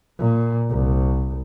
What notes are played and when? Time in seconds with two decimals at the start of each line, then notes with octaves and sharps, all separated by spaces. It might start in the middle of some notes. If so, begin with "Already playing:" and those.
0.18 A#2
0.70 C2